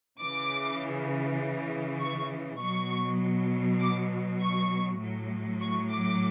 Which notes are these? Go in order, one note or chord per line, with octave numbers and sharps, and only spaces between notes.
C#3 E3 D6
C#6
B2 F#3 C#6
D6
C#6
A2 F#3
C#6
D6